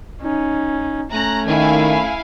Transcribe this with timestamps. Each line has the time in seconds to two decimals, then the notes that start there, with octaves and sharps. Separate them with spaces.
0.22 C#4 D#4
1.11 A3 C#4 A#5 F#6
1.47 D#3 E4 F5 G#5